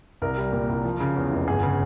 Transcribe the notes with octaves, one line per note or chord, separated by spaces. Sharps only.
C2 A#4
G3
A#2
C2
F3
C#3
E2
F1
G1 G#4
C#3